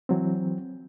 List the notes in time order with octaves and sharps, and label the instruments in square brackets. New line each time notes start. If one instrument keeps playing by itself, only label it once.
[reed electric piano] E3 F#3 C4